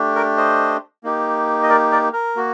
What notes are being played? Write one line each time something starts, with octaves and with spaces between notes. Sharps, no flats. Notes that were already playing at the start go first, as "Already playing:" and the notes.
Already playing: A3 D4 G4
A#4 D5
C5 D#5
A#3 D#4 G4
D#5
A#4 D5
A#4 D5
A#4
A#3 F#4